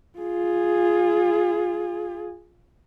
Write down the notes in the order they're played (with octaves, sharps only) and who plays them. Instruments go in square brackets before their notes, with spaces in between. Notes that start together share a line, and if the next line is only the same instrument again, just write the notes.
[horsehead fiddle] F4 G#4